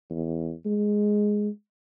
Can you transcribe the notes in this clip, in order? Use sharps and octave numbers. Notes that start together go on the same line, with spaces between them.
E2
G#3